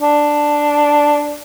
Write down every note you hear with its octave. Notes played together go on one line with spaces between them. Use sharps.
D4